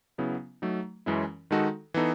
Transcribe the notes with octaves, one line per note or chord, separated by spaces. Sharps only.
C#3 F#3 B3 E4
F#3 A3 D#4
F#2 E3 G#3 C#4 E4
D#3 G#3 D#4 F#4 A4
E3 B3 D#4 A4